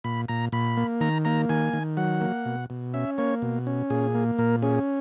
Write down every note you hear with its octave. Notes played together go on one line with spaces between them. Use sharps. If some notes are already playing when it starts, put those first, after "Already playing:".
A#2 B5
A#2 A#5
A#2 B5
A#3
D#3 A#5
A#3 A#5
D#3 G#5
D#3
F#3 F#5
A#3
B2
B2
C#4 E5
A#3 C#5
B2
C#4
A#2 G#4
A#3
A#2 A#4
C#4 G#4